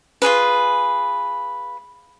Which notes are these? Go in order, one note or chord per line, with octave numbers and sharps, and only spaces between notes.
F4 F#4 G#4 B4